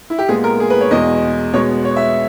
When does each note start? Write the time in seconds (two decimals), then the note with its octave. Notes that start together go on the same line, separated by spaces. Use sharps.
0.10 E4
0.18 G4
0.28 A#2 G#3 B3 G#4
0.44 A#4
0.60 G#4
0.70 B4
0.81 C#5
0.91 E2 B2 G#3 D#5
1.54 B2 G#3 B3 C#5
1.85 C#5
1.96 E5